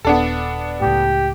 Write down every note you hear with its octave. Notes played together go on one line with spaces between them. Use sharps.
D#1 B3 D4 A4
C#2 A2 G4